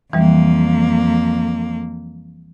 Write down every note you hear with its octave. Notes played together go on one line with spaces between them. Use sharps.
F2 E3 G3 A#3